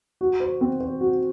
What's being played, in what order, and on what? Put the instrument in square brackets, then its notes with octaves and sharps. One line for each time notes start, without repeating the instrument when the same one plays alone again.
[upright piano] F#4
C5
C4
C5
F#4